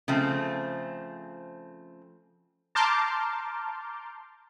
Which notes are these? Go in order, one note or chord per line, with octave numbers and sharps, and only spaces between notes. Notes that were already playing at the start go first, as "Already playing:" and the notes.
C#3 F3 A3 C4
A5 A#5 C6 D6 F6 G6